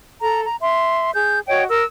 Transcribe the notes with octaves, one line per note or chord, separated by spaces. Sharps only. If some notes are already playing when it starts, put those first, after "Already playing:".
A4 A#5
A#5
E5 C6
G#4 G6
F#4 C#5 D#5 G5
A#4 E6